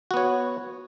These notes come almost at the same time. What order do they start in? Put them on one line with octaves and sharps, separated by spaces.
F#4 B3 C#5